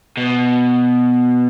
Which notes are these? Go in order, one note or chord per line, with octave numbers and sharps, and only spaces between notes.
B2